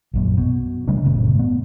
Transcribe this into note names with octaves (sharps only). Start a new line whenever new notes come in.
A#1 F#2 A#2
B2
C#3 G3 A3 D4
F#1 A#2 C#3
A2 B3